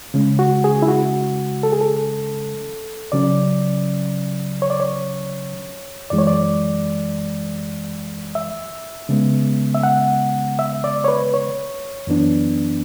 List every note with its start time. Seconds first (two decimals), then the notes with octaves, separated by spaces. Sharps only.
0.14 C#3 G#3 C#4
0.39 F#4
0.64 G#4
0.82 E4
0.88 F#4
1.63 A4
1.72 G#4
1.81 A4
3.12 C#3 F#3 C#4 D5
4.62 C#5
4.70 D5
4.80 C#5
6.10 F#2 E3 G#3 D5
6.18 C#5
6.27 D5
8.35 E5
9.09 C#3 G#3 B3
9.75 E5
9.83 F#5
10.59 E5
10.84 D5
11.04 C#5
11.08 B4
11.34 C#5
12.07 F#2 E3 B3 D4